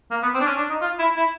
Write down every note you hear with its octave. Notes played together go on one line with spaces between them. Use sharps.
A#3
B3
C4
D4
C#4
D4
D#4
F4
E4
E4